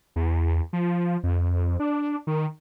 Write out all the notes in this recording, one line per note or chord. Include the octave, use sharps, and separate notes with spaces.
E2
F3
F2
D4
D#3